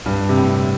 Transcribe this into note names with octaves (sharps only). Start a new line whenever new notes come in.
G2
C3
A2